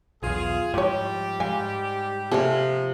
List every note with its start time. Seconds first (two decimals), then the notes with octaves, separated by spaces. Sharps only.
0.23 B1 E2 F4 G#4
0.74 G#2 E3 F3 G3 G4 C#5
1.40 G#2 F5 G#5
2.31 C3 F3 A#3 G#4 A4